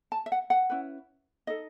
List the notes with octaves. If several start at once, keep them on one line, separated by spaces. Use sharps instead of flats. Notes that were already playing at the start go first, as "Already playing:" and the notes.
A5
E5
F#5
F#5
C#4 E4 B4
D#4 A4 D#5